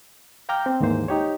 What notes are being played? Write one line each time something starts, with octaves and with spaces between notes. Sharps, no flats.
F5 G5 A#5 D6 F6 G6
C4
D#2 G#2 E3 A#3 C5
D#4 G4 C#5